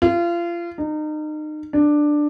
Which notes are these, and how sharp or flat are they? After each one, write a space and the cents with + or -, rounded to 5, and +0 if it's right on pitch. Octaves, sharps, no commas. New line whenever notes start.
F4 -30
D#4 -30
D4 +10